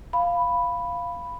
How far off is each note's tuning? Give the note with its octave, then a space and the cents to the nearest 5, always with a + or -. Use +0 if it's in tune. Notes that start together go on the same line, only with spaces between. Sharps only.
F5 +0 B5 +0